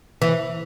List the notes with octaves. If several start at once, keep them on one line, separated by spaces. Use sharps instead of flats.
E3